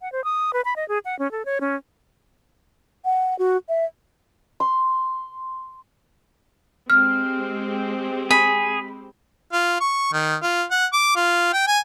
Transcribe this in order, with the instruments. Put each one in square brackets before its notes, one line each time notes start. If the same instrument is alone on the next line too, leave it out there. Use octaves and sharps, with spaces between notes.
[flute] F#5
C5
D#6
B4
B5
D#5
G#4
F#5
C#4
A4
C#5
C#4
F#5
F#4
E5
[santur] C6
[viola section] G#3 C4 G4 [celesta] F6
[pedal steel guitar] G#4 [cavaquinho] B5
[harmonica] F4
C#6
D#3
F4
F#5
D6
F4
G5
G#5